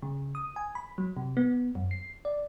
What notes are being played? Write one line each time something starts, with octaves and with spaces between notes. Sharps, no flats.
C#3
D#6
G#5
B5
F#3
C3
B3
F#2
C7
D5